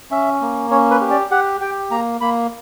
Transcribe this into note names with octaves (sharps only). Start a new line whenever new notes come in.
C#4 E5
A#3
C#4 C#5
B4
G4
D5
G4 F#5
G4 G5
A#3 A#5
A#3 B5